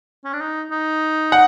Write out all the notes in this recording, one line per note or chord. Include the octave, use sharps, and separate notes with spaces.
C#4
D4
D#4
D#4
F#5